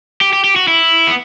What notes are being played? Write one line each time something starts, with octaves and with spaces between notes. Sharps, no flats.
G4
G4
G4
F#4
E4
B3